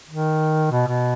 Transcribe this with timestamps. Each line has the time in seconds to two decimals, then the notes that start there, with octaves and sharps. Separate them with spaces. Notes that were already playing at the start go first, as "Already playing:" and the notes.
0.09 D#3
0.71 B2
0.87 B2